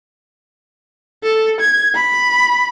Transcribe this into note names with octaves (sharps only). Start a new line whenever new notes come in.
A4
G#6
B5